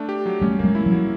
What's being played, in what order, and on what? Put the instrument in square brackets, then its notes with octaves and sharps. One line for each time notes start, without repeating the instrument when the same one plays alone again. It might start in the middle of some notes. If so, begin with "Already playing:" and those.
Already playing: [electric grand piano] A3 D4
G4
F#3
[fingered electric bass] G3 A3 [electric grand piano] C#4
[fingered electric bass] A3 [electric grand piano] A#3
[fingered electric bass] F#3 G#3
[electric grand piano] E4
[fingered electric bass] F3 G3
[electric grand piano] F#3